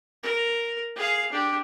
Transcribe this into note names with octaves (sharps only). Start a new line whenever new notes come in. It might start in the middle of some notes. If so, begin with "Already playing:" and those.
A#4
G#4 F5
D4 G4